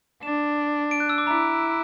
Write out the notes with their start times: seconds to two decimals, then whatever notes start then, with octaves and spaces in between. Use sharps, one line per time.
0.23 D4 E7
0.91 D7
1.00 F#6
1.09 E6
1.18 D6
1.26 E4 A#5